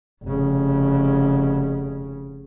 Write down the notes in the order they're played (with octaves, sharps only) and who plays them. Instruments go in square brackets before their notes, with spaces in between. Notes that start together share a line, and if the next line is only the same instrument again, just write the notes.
[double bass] F1 C#3